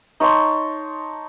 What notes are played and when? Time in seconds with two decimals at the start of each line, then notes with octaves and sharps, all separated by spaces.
0.20 D#4 C#5 A5 C6